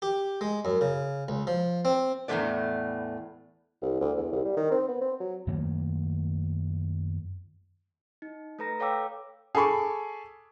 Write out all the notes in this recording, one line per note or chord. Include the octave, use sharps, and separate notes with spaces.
G4
G#3
F#2
C#3
C#2
F3
C4
E2 A2 C#3 A3 B3 D5
C2
D2
E2
C2
G3
D#3
C4
B3
C4
F#3
F#2 D#3 A3 A#3
D#4
A3 A4 B4 A#5 A#6
A4 C#5 F5 G5 D6 E6
G#4 A4 B5 C#6 D6